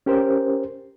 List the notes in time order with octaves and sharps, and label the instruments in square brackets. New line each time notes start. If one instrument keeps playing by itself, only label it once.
[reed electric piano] C#4 G4 A#4 C5